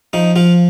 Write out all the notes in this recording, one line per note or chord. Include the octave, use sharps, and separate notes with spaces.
F3 D#4
F3 F4